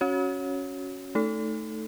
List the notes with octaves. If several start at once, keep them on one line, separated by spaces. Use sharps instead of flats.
C#4 F#4 C#5
A3 D#4 A4